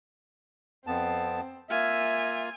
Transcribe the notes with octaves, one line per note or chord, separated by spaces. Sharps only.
F2 B3 C4 A5
A#3 F4 E5 G#5 F6